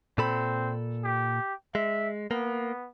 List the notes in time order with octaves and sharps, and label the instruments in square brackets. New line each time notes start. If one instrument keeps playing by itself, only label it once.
[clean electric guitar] A#2 A4 B5 [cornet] C4
[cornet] G4
[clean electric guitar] G#3 [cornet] E5
[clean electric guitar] A#3 [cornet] B3